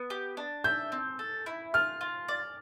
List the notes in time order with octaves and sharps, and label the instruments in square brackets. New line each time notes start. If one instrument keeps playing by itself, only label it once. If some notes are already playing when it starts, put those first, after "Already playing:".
Already playing: [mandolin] B3
G4
D4
[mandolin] E5 [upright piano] G6
[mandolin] C4
A4
E4
[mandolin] F4 [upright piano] F6
[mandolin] F4
D5